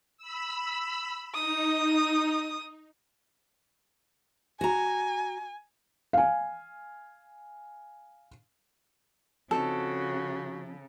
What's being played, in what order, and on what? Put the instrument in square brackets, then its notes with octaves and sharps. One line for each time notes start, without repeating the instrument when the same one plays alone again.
[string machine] B5 E6
[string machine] D#4 [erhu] D#6
[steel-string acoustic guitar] F#4 A#5 [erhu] G#5
[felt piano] F5 G#5
[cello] C#3 [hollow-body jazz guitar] F3 C4 D#4 [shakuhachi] F#4 [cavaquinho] A4